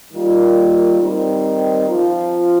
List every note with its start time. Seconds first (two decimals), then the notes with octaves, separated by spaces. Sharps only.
0.13 D#3 G3 A#3 F4
1.00 D#3 G3 C4 D#4
1.88 F3 C4 F4